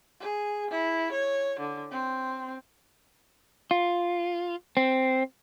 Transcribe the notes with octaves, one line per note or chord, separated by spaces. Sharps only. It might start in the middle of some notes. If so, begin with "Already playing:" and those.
G#4
E4
C#5
D3
C4
F4
C4